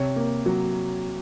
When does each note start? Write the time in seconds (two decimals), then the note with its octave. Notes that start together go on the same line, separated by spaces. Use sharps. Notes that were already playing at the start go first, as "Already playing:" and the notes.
Already playing: C3 C#5
0.16 A#3
0.46 F#3